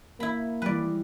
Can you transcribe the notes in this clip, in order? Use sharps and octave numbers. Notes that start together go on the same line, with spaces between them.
A#3 E4 B5
E3 G3 G#3 B4 D5